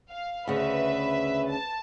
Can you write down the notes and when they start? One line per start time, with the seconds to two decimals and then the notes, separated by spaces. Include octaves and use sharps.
0.10 F5
0.48 D2 C#3 B4 E5
1.50 A5